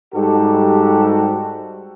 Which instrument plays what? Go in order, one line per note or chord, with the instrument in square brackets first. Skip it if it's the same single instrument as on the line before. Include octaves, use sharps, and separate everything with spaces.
[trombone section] G#2 G3 F#4 G4 A4